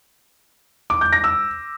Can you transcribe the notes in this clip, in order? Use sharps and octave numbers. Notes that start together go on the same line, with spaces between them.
D6
G6
A#6
E6